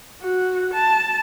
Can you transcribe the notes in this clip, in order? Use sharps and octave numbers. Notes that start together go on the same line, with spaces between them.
F#4
A5